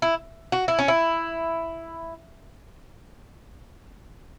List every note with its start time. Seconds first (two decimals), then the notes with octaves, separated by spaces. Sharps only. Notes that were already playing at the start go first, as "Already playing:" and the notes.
0.02 E4
0.52 F#4
0.68 E4
0.79 C#4
0.88 E4